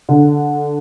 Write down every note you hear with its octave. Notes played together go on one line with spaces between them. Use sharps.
D3